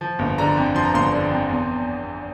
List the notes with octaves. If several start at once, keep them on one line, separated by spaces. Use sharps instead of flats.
F3
G1
D3 A#5
F2
F3 C6
A#5
G1 C6
D3
F2
E2